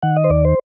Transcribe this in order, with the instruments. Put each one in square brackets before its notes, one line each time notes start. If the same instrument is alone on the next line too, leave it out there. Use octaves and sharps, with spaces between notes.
[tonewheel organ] D#3 F#5
D#5
C5
D#2 D5
C5